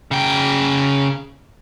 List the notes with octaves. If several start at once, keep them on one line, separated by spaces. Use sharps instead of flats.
C#3 G5